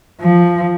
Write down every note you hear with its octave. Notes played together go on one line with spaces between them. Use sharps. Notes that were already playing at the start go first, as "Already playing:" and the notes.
F3